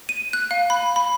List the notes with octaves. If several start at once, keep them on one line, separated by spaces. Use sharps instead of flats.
D#7
F#6
F5
B5
B5